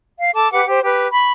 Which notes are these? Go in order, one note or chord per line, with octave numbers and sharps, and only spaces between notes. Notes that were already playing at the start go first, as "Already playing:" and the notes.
F5
A4 A5 D6
G4 B4 F#5 D6
G4 C5
G4 B4
B5 C#6